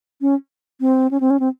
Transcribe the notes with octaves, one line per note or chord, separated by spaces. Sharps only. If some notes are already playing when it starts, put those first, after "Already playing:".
C#4
C4
C#4
C4
C#4
C4